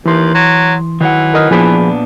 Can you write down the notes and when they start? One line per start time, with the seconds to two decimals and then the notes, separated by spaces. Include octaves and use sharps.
0.06 D#2 E3 C6
0.34 F#3
1.01 D#3 E3 F#3 F#5
1.34 A#4 D#5 F6
1.51 A#2 F3 B3 D4 G#4 B5